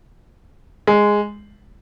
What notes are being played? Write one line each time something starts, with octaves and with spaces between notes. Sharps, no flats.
G#3